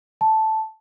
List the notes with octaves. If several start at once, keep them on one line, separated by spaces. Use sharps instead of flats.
A5